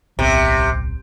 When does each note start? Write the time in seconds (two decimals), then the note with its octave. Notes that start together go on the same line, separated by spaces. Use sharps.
0.19 D1 B1 C3 B3